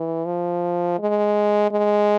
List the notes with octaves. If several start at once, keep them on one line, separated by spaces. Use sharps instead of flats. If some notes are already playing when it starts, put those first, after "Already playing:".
Already playing: E3
F3
G#3
G#3